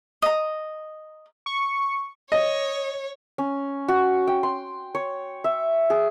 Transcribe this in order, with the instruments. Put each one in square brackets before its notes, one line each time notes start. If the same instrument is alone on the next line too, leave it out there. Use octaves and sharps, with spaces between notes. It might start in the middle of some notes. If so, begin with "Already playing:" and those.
[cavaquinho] D#5 A#5
[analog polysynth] C#6
[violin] C#5 [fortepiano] D#5
[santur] C#4
F#4
G5
C6
C#5
E5
G#4